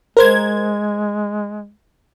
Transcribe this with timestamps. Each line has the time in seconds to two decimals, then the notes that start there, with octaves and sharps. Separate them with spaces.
0.17 G#3 A#4 C5 G#6